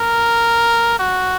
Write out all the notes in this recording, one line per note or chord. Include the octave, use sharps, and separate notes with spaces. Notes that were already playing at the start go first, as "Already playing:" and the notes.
Already playing: A#4
F#4